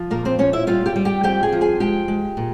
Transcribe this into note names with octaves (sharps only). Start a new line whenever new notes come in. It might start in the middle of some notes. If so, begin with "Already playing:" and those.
Already playing: F3
A#2 A#3 A#4
C4 C5
A#2 C#4 C#5
E4 E5
G3 F4 F5
G4 G5
G3
G4 G5
F2 G4 G5
G#4 G#5
F3
G#4 G#5
G#3 G4 G5
G#3
A#2